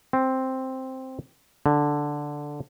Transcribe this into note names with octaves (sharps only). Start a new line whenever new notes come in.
C4
D3